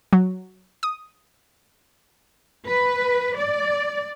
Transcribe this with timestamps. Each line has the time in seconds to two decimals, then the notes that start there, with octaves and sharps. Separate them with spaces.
0.13 F#3
0.83 D#6
2.67 B4
3.37 D5